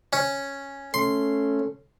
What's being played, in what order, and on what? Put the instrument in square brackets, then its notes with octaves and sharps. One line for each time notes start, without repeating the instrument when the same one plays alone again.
[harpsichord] C#4
[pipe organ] A3 C#4 [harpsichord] C6